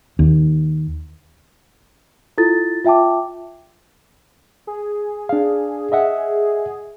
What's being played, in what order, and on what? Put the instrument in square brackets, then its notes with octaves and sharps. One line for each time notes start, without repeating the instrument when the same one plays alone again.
[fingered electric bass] D#2
[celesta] E4 F4 A4 A6
F4 E5 G5 A5 D6
[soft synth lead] G#4
[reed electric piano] D4 F5
D#5 E5 F#5